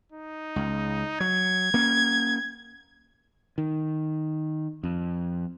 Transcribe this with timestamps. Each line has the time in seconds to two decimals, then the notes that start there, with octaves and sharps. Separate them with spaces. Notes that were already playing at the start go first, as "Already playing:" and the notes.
0.12 D#4
0.56 C#2
1.20 F#3 G#6
1.74 A#3 C#4
3.58 D#3
4.83 F2